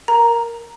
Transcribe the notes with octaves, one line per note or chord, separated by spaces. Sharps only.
A#4 A#5